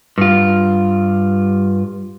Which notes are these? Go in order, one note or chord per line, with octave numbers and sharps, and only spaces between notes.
G2 F4